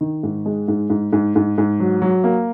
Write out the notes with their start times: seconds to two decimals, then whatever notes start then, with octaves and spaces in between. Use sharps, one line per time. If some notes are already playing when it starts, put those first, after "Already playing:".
0.01 D#3
0.23 G#2
0.46 G#3
0.68 G#2
0.90 G#2
1.13 G#2
1.36 G#2
1.58 G#2
1.80 F#3
2.02 F#3
2.24 A#3